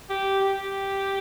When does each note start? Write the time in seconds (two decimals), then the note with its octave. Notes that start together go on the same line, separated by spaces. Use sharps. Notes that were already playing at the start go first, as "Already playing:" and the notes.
0.10 G4
0.41 G4